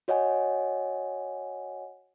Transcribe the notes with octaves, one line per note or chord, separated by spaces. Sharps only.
F#4 C#5 D#5 F#5 G#5